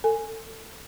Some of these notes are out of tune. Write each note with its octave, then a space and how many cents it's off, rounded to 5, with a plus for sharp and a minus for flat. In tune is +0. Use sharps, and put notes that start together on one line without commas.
A4 +25 G#5 +0